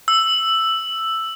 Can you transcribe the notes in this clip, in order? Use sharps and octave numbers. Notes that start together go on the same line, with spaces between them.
E6